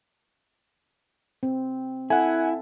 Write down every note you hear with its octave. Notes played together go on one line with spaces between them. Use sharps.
C4
E4 A4 F#5 G#5